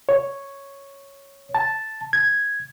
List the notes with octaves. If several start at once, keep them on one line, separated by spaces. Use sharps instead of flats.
C#5
A5
G#6